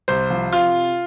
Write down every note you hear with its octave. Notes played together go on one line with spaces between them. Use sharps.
C2 C5
F3
C3 F4